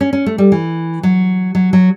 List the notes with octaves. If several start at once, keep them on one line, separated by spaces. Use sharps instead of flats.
C#4
C#4
A3
G3
E3
F#3
F#3
F#3